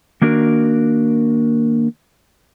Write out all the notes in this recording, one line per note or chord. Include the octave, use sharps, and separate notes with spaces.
D#3 A#3 D4 F#4 A#4